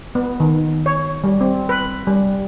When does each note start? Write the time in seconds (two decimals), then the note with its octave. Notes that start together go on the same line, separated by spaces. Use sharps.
0.15 B3
0.40 D#3
0.86 C#5
1.24 G3
1.41 C4
1.69 B4
2.07 G3